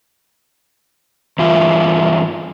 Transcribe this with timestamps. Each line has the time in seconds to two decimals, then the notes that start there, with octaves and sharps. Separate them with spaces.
1.39 G2 E3 F4 E5